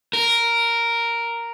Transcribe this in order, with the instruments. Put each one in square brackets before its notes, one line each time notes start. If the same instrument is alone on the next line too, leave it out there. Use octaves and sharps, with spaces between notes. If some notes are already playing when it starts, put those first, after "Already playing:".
[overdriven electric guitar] A#4